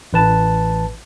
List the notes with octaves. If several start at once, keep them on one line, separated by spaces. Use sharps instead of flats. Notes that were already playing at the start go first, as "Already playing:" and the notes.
A1 B4 A5